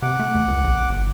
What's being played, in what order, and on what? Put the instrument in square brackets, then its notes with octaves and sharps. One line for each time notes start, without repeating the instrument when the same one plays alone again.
[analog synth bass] C3 [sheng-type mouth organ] F#5 D6
[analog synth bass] A3
E2
C#2
A#1
G1